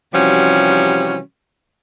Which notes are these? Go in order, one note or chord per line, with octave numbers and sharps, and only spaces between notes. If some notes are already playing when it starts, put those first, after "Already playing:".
C3 E3 F3 G3 C#4 F#4